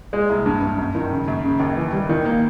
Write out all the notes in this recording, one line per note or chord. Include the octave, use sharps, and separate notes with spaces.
G#3
C2
G2
G2
F#2
D#3
C#3
F#2
C#3
D#2
E3
G3
D#3
A#3